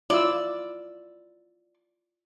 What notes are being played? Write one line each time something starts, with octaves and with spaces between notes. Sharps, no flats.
E4 F4 D5 E6